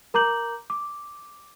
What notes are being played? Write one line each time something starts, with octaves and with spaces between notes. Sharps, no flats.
A#4 A#5 D6 G6 F#7
D6